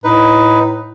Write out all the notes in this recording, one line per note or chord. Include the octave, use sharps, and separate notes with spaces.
A2 D#4 B4